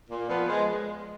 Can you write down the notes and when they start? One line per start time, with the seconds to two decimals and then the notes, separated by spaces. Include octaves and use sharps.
0.10 A#2
0.29 F3 B3
0.48 G#3